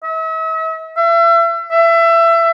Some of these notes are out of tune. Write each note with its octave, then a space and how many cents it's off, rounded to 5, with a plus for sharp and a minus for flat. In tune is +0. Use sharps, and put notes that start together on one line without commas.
E5 -40
E5 +35
E5 +25